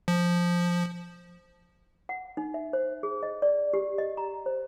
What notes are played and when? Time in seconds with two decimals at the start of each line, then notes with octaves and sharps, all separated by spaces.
0.08 F3
2.09 F#5
2.37 D#4
2.54 E5
2.73 C5
3.03 G#4
3.23 D#5
3.42 D5
3.74 G4
3.98 D#5
4.17 A#5
4.46 C5